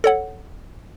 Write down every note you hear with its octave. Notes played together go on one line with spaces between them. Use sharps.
A4 C#5 F#5